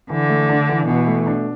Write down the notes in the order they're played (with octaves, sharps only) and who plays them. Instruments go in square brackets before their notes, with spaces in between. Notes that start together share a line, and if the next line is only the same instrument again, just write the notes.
[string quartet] D3 [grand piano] E3
[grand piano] A3
D4
E3
[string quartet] B2 [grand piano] E3
[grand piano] A3
D4